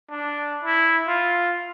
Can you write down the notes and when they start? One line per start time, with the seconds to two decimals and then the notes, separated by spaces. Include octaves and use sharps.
0.10 D4
0.64 E4
1.07 F4